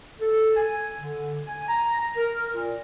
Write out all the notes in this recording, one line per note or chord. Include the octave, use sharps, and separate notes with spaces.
A4
G#5
D3
G#5
A#5
A#4
A#2